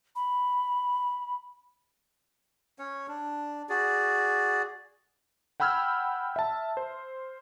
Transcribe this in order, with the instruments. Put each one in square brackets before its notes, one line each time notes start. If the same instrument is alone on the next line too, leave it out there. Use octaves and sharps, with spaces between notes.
[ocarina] B5
[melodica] C#4 C#5
D4
F#4 G#4 D5
[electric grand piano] F#5 G5 B5 E6 F6 G#6
E5 A5
C5